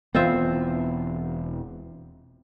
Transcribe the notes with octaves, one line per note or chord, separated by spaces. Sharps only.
E1 E3 B3 C4 F4 E5